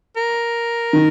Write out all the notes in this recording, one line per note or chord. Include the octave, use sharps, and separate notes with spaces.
A#4
D#3